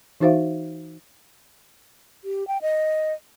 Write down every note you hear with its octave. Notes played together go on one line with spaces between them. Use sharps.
E3 D#4 F#4 C5 E5 F5
G4
G5
D#5